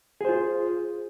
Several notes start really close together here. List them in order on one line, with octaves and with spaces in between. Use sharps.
G#4 C5 F4